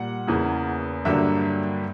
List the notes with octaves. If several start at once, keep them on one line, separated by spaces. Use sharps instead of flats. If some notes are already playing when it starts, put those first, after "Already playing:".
Already playing: A#2 G3 F#5
E2 C#3 E3 A#3
G2 D3 F#3 A#3 E5